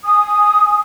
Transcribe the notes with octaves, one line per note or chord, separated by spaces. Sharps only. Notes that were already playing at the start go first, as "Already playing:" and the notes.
G#5 D#6